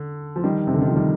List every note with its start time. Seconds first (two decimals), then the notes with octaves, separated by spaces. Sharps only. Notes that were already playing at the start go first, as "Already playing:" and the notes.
Already playing: D3
0.36 F3
0.44 D#3 G3
0.67 C3
0.74 D3
0.82 D#3
0.88 F3
0.96 D#3 G3